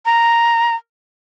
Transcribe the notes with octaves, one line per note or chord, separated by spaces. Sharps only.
A#5